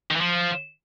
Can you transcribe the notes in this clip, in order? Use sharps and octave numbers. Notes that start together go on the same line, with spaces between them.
D#3
E3
F3